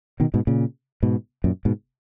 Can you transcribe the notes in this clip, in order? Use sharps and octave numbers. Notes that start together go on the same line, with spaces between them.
B2 D#3
G#2 B2
A#2 C#3
G#2 B2
F#2 A#2
G#2 B2